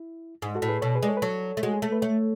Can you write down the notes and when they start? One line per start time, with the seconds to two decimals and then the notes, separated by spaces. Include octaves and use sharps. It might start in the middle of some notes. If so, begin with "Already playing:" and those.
Already playing: E4
0.42 G#2
0.55 F#4 A4
0.62 A2
0.68 G#4 B4
0.82 B2 A4 C#5
0.95 G#4 B4
1.03 G#3 D5
1.08 A4 C#5
1.17 B4
1.22 F#3 A4 C#5
1.57 A3
1.63 G#3 F#4
1.74 G#4
1.82 A3 A4
1.92 B4
2.02 A3 A4 C#5